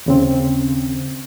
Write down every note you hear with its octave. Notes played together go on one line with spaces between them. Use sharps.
D#2 C#3 C4